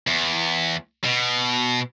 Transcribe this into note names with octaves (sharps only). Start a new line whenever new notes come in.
E2
B2